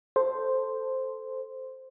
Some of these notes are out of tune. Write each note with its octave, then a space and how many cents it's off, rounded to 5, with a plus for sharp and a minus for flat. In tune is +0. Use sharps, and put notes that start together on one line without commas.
A4 +0 C5 +0